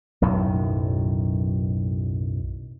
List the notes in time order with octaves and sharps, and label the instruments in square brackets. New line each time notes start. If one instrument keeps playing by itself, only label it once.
[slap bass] B1 F#2 A2 D#3